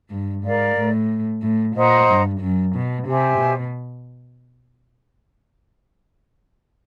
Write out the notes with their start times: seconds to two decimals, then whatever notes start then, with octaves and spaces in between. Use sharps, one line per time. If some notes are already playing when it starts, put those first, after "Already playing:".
0.10 G2
0.43 G#2 A#4 D5 F5
0.77 A2
1.42 A2
1.75 A#2 C5 D#5 F#5 A#5
2.08 G2
2.41 F#2
2.74 B2
3.06 C3 G4 C5 E5 G#5
3.40 B2